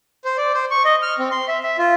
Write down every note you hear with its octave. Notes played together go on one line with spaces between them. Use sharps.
C5
D5
C5
C#6
D#5
F6
C4
C6
E5
E5
F4